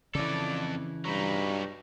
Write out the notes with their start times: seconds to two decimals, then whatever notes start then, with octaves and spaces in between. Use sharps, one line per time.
0.15 F2 C#3 E3 A4 D5
1.05 G2 F#3 D#4 B5